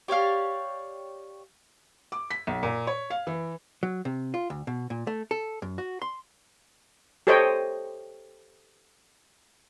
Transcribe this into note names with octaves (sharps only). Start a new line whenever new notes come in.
G4 C#5 D5 F5
D6
B6
B1
A#2
C#5
F5
E3
F#3
C3
F4
D2
B2
A#2
A3
A4
F#2
F#4
C6
G4 A4 C5 C#5 D#5 G5